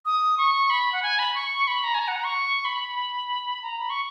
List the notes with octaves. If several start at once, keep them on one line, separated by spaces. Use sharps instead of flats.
D#6
C#6
B5
F#5
G#5
B5
C#6
B5
A#5
G#5
A#5
F#5
A#5
C#6
B5
A#5
B5
C#6